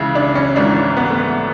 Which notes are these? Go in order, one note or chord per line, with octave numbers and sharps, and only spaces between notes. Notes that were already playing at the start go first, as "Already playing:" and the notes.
Already playing: C#2 C#3 E3 E4
D4
C#4
G#1 G#2 E3 D4
B3
A3